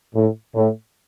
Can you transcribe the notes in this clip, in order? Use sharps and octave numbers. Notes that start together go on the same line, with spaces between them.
A2
A2